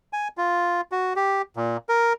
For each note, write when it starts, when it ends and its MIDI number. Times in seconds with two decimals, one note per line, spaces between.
0.13 0.28 80
0.38 0.81 65
0.92 1.13 66
1.16 1.42 67
1.56 1.77 46
1.89 2.13 70